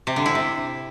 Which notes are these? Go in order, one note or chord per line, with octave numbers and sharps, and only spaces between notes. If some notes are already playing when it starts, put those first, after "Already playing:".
C3
D3
E4
C3